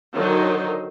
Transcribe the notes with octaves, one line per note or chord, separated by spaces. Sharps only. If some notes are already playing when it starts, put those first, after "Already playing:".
D3 D#3 F#3 D#4 C5